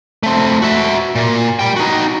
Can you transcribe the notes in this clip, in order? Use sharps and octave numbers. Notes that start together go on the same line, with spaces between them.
A3 C4
F#4 E5
A#2
G3 G5
D#4 F#4